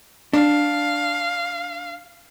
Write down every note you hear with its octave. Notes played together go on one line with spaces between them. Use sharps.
D4 F5